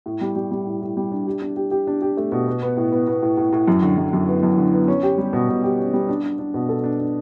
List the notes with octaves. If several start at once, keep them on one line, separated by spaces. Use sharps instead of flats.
A2
G3
G3
G3
A2
A2
G3
D4
G4
D4
G4
G4
D4
G4
A3
B2
B3
B3
A2
B3
B3
A2
A2
A2
F#2
D3
F#2
F#2
B3
F#2
D3
B3
C#4
G4
G3
B2
B2
G4
C#4
G3
D4
D4
D4
B2
A4
D4
D4